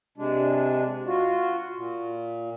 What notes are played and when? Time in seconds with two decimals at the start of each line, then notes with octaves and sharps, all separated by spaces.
0.18 C3 G#3 D4
1.06 F4 F#4
1.75 A#2